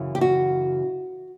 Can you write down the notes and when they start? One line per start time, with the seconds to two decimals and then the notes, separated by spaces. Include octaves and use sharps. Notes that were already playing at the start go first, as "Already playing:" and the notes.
Already playing: F#2 C#3 E3
0.15 G4
0.21 F#4